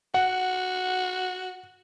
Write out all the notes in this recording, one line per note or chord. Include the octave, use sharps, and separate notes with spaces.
F#4 F#5